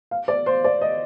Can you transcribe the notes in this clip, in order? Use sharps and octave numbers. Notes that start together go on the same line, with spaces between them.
F5
D5
C5
D5
D#5